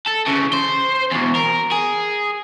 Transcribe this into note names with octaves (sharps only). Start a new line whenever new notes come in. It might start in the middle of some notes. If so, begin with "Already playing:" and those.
A4
C#3 E3
C5
E2 B2
A#4
G#4